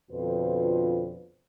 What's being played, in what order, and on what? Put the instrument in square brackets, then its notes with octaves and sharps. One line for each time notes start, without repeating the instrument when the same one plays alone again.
[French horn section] F2 B2 D3 F4 B4 C5